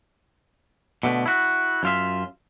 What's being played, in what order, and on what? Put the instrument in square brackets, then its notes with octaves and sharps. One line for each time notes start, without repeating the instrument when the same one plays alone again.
[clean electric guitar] B2 D3 A3
E4 F#4
F#2 F4 E5